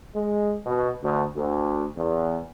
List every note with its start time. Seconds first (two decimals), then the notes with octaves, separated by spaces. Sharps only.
0.15 G#3
0.66 B2
1.03 D2
1.36 D2
1.97 E2